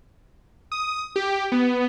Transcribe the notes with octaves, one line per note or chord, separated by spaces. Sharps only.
D#6
G4
B3